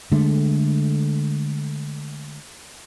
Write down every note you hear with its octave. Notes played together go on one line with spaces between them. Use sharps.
D3 G#3 A3